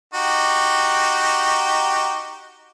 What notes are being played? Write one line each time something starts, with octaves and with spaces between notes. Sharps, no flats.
D#4 F#4 G4